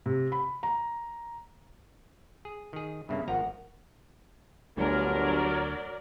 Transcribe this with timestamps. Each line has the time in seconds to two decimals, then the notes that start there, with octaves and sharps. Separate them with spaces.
0.06 C3
0.32 B5
0.63 A#5
2.45 G#4
2.73 D#3 G#4
3.09 G2 C#3 A#3 B3 E5
3.28 G#1 F3 A#4 F#5 A#5
4.77 G1 D2 F#3 A#4 C#5 D5